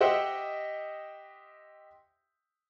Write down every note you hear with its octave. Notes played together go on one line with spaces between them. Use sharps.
G4 C5 D#5 E5 F#5 G5